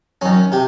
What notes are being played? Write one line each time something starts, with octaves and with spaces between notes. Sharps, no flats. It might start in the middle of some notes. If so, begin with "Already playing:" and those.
F#2 D#3 C#4
C3 G4